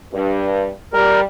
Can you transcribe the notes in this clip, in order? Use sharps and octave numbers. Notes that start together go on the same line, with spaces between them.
G2
G3 A#4